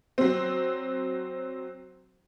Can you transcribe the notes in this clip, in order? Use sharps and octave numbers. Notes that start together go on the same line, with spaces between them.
F#3 C4